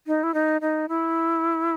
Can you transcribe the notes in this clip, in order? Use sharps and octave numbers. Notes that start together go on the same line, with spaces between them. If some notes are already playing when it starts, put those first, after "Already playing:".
D#4
E4
D#4
D#4
E4